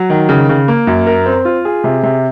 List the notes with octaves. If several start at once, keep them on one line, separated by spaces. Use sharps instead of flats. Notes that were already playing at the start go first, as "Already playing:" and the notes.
Already playing: F#3
D#3
C#3
C#3
A#3
F#2
A#4
C4
F4
G#4
C3
C3